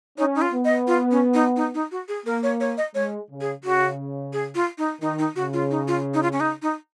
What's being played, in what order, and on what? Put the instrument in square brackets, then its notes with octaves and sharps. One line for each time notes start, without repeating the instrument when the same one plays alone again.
[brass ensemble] C#4 [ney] D#4
[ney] D#4
F4
[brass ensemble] B3
[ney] D#5
F4
C#4
D#4
D#4
D#4
F#4
G#4
[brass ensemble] A#3 [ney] A#4
[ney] C#5
C#5
D#5
[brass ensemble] G#3 [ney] C#5
[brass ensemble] C#3
[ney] G#4
[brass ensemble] C#3 [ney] F#4
[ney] G#4
F4
D#4
[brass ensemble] D#3 [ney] D#4
[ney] D#4
[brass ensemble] C#3 [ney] F#4
[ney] F4
D#4
F4
D#4
F4
C#4
D#4
D#4